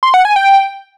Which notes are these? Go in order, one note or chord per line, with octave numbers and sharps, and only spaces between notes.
C6
F#5
G#5
G5